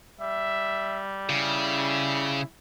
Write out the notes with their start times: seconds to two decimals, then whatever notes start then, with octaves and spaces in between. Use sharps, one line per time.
0.21 G3 E5
1.29 C#3 E4